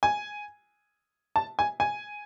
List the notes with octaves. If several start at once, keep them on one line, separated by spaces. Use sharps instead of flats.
G#5
A5
G#5
G#5